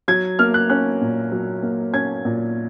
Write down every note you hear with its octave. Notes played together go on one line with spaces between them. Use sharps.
F#3 G#6
A#3 F6
F#6
C#4 F#6
A#2
F#3
A#3
C#4 G#6
A#2